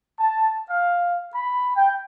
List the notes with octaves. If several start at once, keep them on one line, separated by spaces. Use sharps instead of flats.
A5
F5
B5
G5